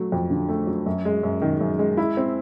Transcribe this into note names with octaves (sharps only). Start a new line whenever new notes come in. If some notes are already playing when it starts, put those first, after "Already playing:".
Already playing: F#3 A3
F2
D3
A3
F#3
F#2
G#3
F#2
D#3
F#2
G#3
E4
C4